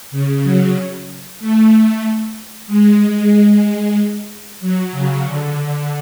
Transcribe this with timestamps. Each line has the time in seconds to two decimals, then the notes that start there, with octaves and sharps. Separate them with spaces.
0.11 C#3
0.43 F#3
1.40 A3
2.67 G#3
3.32 G#3
4.61 F#3
4.92 C#3
5.24 D3